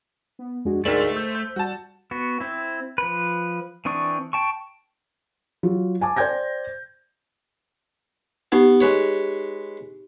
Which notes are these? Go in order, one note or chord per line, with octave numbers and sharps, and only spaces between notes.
B3
F2 G#3 D4 F#4
D2 G#2 A3 G#4 A#4 C5 D5 F#7
E6 G6
G6
G3 F#4 A5
B3 F#4
C4 E4
F3 B4
E3 C4 D4 C#6 D#6
G5 A5 C#6
F#3 F4
G#5 A5 D6
C5 D5 G5 G6 G#6 A#6
B3 D#4 G4
G#3 B4 C#5